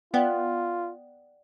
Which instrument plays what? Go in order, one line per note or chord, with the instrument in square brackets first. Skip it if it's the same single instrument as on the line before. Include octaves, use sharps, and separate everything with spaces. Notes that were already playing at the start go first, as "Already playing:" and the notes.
[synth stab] B3 [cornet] F4 [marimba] D5 F#5 G5